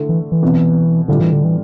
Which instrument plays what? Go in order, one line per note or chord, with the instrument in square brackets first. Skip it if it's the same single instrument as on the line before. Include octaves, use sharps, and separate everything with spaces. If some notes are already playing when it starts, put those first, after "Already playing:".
Already playing: [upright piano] D3 A3 E4
[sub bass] E3
E3
[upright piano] C2 B2 B3
[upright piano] A2 G3 D4 F4 [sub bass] D3
[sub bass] E3
D3
E3